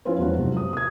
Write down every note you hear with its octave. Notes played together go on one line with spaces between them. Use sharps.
F3 C#4 E4 F4 B4 C5
E1 F#3 F#4
C3
D#6
D#6 G#6